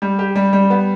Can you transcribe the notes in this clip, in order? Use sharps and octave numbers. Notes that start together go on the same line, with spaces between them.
G3
G4
G3
G3
B3